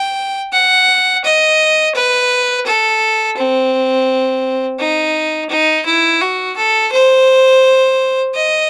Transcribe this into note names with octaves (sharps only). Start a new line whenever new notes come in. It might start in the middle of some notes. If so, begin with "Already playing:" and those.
Already playing: G5
F#5
D#5
B4
A4
C4
D#4
D#4
E4
F#4
A4
C5
D#5